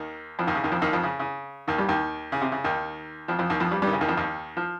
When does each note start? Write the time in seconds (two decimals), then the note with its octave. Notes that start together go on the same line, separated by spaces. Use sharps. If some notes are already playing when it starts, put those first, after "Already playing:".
Already playing: D#2 D#3
0.39 F2 F3
0.47 D#2 D#3
0.55 C#3
0.64 D#2 D#3
0.72 F2 F3
0.82 D#2 D#3
0.93 F2 F3
1.03 C#3
1.19 C#3
1.68 D#2 D#3
1.78 G2 G3
1.89 D#2 D#3
2.32 C#3
2.41 C3
2.52 C#3
2.64 D#2 D#3
3.28 F2 F3
3.39 F2 F3
3.50 D#2 D#3
3.60 F2 F3
3.71 G2 G3
3.82 G2 G3
3.87 D#3
3.93 C#3
4.01 D#2 D#3
4.08 F2 F3
4.17 D#2 D#3
4.57 F3